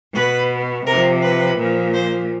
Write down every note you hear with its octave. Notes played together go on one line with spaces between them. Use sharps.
B2 B4
C3 F3 A#4
B4
A#2 F3
C5